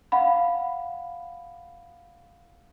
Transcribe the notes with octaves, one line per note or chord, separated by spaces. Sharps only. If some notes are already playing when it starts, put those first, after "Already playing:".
F5 F#5 B5